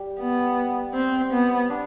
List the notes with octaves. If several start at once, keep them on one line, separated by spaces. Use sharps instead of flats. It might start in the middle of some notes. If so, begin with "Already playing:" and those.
Already playing: G3 G4
B3
C4
B3
D4